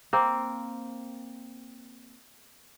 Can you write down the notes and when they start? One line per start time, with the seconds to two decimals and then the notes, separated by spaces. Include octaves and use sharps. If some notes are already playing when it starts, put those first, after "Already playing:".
0.13 A#3 C4